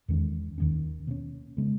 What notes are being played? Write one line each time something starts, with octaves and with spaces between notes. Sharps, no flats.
E2 D#3 G#3 C#4
D#2 D#3 A#3 C#4
B2 A#3 C#4
C#3 G#3 B3